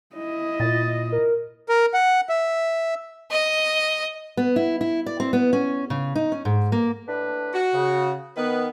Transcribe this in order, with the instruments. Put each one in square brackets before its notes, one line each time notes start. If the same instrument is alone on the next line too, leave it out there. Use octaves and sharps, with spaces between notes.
[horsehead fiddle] E4 D#5
[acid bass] A#2 [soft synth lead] A6
[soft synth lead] A#4
[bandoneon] A#4
F#5
E5
[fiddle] D#5
[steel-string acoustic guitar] B3
E4
E4
D5
C4
B3
C#4
C#3
D#4
C#4
G#2
A#3
[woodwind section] A2 D4 B4
[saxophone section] F#4
[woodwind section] C#3
[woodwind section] D#3 B3 [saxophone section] B4